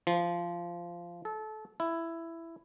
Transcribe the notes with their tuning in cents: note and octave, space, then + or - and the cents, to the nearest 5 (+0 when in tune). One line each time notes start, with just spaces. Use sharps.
F3 -15
A4 -25
E4 +10